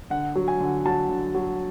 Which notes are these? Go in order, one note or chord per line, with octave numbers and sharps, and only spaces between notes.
D3 F#5
F#3
G#5
D3
F#3 A5
D3
F#3